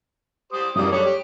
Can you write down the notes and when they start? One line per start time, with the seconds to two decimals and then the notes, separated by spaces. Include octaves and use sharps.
0.53 G4 C5 D#6
0.76 F#2 E3 G3 A#3 D#6
0.92 G3 A3 D4 C#5
1.06 G4